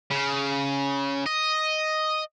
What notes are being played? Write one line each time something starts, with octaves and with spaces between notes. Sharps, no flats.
C#3
D#5